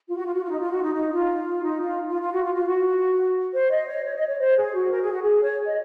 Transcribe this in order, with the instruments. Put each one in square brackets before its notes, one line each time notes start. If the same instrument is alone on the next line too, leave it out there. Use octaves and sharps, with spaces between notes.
[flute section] F4
F#4
F4
F#4
F4
D#4
F4
F#4
D#4
D#4
F4
D#4
F4
F4
F4
F#4
F4
F4
F#4
C5
D#5
C#5
C#5
D#5
C#5
C5
G#4
F#4
A#4
G#4
F#4
G#4
C#5
D#5